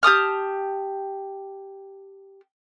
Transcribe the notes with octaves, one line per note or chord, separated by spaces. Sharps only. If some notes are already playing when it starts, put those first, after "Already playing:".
G4 A5 D#6 F6